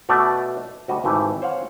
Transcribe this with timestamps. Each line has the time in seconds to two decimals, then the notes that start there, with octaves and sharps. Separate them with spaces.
0.09 B2 A3 F#4 D5
0.88 D2 G3 F#4 D#5
1.04 G#1 E3 A3 G4
1.42 C5 C#5 F5 F#5